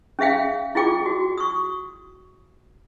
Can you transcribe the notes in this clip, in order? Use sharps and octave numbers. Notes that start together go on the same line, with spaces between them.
C#4 G#4 E5 F5 G5
E4 F4 G#4 G5 D6
F#4
C#6 D#6